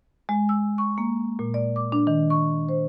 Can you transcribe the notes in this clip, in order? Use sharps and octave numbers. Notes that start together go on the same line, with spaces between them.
G#3
E6
C#6
A#3
A#2
D5
D6
D4
D#3
C#6
C5